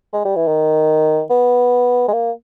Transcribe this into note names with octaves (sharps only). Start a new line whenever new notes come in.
G#3
G3
E3
D#3
B3
G#3
A#3